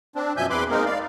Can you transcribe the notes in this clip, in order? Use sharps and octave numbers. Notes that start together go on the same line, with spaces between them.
C4 D4
F#2 B2 F3 E5 G#5 G6
E2 C4 B4 B5 C6 D6
G#3 A#3 C4 D#4 A#4
D5 F5